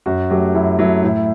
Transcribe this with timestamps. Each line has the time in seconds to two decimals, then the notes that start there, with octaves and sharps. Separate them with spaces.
0.06 F#2 F#4
0.30 F#3 A3 G4
0.55 F#2 E4
0.79 F#3 A3 E4
1.03 A2 E4